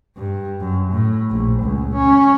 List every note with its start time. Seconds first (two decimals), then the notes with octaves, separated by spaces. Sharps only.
0.16 G2
0.61 F#2
0.92 A2
1.30 A#1
1.61 C#2
1.94 C#4